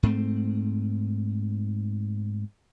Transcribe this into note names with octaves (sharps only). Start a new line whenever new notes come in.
G#2 A3 C4